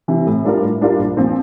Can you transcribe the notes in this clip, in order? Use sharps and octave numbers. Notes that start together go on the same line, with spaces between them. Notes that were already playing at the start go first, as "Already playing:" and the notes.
C3 E3
A2
G3 D4 F4 A#4
A2
G3 D4 F4 A#4
A#1
A#2 F3 C4